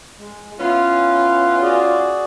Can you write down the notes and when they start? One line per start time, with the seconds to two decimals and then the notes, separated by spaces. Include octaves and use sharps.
0.18 G#3
0.59 B3 C#4 E4 F4 B4
1.62 F#4 G#4 D5